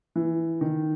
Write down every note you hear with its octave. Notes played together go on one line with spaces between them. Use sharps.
E3
D#3